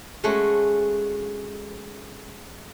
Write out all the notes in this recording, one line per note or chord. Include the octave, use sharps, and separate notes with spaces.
G#3 A3 C#4 F#4